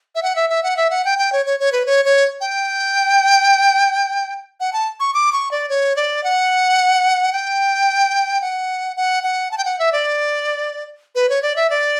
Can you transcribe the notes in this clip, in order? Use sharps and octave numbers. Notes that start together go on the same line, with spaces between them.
E5
F#5
E5
E5
F#5
E5
F#5
G5
G5
C#5
C#5
C#5
B4
C#5
C#5
G5
F#5
A5
C#6
D6
C#6
D5
C#5
D5
F#5
G5
F#5
F#5
F#5
A5
G5
F#5
E5
D5
B4
C#5
D5
E5
D5